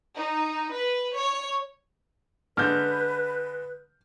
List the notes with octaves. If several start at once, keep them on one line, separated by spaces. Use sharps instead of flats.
D#4
B4
C#5
D3 G#3 B4 F6 G6